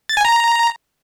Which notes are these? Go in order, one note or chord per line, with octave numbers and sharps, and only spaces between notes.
A6
G#5
A#5